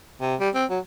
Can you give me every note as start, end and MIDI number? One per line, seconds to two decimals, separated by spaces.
0.21 0.35 48
0.40 0.49 55
0.55 0.65 60
0.70 0.79 54